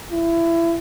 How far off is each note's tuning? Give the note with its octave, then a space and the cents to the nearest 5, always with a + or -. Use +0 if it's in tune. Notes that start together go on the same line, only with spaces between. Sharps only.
E4 +25